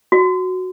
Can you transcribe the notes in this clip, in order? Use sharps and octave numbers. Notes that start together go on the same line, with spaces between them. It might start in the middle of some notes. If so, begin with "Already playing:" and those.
F#4